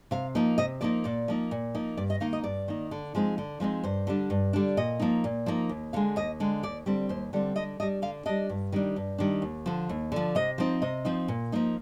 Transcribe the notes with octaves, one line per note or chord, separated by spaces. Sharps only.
C3 F5
F3 A#3 D#4
C3 D#5
F3 A#3 D#4 D5
A#2 D5
F3 A#3 D#4
A#2
F3 A#3 D#4
G2 D5
D#5
D#3 A#3 D#4 F5
D#5
G2 D5
D#3 A#3 D#4
D3
F3 G#3 C4 D#4
D3
F3 G#3 C4 D#4
G2 C5
D3 G3 D4
G2
D3 G3 D4
A#2 D#5
F3 A#3 D#4
A#2
F3 A#3 D#4
D#2
D3 G#3 F5
D#2 D#5
D3 G#3
D#2 D5
D3 G3 C4
D#2 C5
D3 G3 C4
D3 D#5
G3 D4 D#5
D3 F5
G3 D4 D#5
G2
D#3 G3 D4
G2
D#3 G3 D4
D#2
D3 F3
D#2
D3 F3
C3 D#5
F3 C4 D#4
C3 D#5
F3 C4 D#4
A#2
F3 A#3 D#4